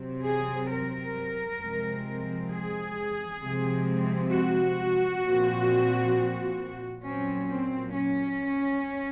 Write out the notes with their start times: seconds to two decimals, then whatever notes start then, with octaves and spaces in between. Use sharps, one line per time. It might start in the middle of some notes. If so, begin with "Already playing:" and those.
Already playing: C3 F#3 C4
0.24 G#4
0.70 A#4
1.60 C3 F3 G#3 C4
2.51 G#4
3.42 C3 F3 G#3 C4
4.32 F#4
5.23 A#2 F3 C4
7.04 A#2 F#3 C4 C#4
7.49 C4
7.94 C#4